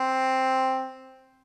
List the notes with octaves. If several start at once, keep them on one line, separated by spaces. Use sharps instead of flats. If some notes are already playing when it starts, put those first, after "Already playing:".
Already playing: C4